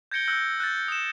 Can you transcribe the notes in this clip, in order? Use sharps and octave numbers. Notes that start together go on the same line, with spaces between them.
G6 G#6 A#6 C#7 D7 G7
E6 F#6 G6 A#6
F#6 G6 A6
D#6 E7